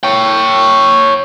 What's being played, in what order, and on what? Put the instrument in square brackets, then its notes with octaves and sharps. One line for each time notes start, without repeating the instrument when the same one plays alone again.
[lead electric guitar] C#5 G5